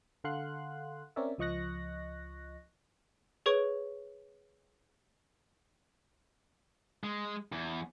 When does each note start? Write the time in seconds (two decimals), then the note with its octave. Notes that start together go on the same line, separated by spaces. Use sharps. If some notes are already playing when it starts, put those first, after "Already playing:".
0.24 D3 A4 F5 F#5 C6 F#6
1.16 C4 C#4 A#4 C#5 D5 E5
1.38 C#2 F3 D#5 C#6 F#6 A#6
3.46 G#4 B4 C#5 C#6 G#6 D7
7.04 G#3
7.52 E2